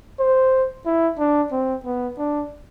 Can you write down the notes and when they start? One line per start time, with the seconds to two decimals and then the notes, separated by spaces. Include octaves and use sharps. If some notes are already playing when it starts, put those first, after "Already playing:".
0.19 C5
0.86 E4
1.19 D4
1.52 C4
1.85 B3
2.18 D4